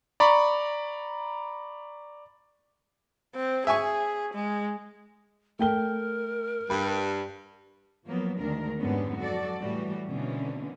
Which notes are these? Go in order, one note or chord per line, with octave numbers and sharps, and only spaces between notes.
D5 A#5 B5 C#6
C4
G#4 E5 G#5 C#6
G#3
A3 A#4 G5 G7
G2 B5
F3 F#3 A#3 B3
D2 D#3 G#3 D4 A#4
F2 G#2 D3 G3 B3 C#4
F#3 F#4 A4 D5
A2 E3 G3 F#4
B2 D3 E3 A#3 C4 C#4